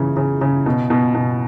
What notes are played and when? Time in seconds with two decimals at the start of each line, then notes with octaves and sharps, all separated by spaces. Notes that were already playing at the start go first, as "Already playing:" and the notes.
Already playing: C#3 E3
0.17 C#3
0.41 C#3
0.66 B2
0.90 B2
1.15 B2